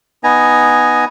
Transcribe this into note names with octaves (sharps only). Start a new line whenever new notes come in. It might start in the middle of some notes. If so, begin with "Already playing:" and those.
B3 D#4 G#5 A#5